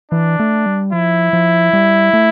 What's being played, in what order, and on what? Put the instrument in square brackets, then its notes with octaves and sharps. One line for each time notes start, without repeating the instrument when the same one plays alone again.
[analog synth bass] E3 [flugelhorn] D4
[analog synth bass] A3
G3
[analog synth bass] F3 [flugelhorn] E4
[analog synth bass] F3
G3
A3